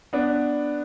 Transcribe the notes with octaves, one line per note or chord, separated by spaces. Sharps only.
B3 D4